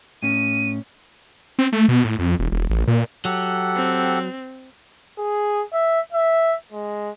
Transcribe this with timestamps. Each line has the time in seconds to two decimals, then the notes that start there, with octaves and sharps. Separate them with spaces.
0.23 A2 C#4 D#7
1.59 C4
1.72 A3
1.89 B2
2.05 A2
2.19 F2
2.39 E1
2.52 E1
2.70 A1
2.88 A#2
3.25 F#3 G4 A4 F#5
3.75 C4
5.18 G#4
5.73 E5
6.13 E5
6.72 G#3